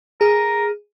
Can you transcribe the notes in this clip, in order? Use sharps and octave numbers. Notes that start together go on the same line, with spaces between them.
G#4 A#4